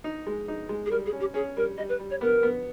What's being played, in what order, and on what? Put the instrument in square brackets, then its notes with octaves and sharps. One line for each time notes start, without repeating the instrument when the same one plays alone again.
[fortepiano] D#4
G#3
D#4
G#3
[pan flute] G#4
[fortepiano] G3 [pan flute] A#4
[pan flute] G#4
[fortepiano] C#4
[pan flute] G4
[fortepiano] C#4 [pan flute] G#4
[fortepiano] G3 [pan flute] A#4
[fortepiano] G3 [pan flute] D#5
[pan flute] B4
[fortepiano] G3
[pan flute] C#5
[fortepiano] B3 [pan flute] A#4
[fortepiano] B3